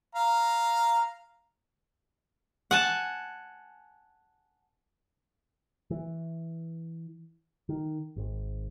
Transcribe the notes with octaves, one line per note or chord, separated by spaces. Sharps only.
F5 A#5
F#5 G#5 A5
E3
D#3
G#1